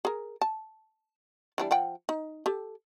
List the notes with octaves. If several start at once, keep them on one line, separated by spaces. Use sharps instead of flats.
G#4 A#4
A5
E3 G3 D4
F3 F#5 G5
D#4
G4 A4